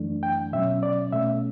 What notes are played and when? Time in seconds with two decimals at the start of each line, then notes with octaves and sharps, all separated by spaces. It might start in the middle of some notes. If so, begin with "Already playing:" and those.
Already playing: F#2 E3 A3 D4
0.23 G5
0.53 B2 F#3 C#4 E5
0.83 D5
1.12 B2 A3 C#4 E5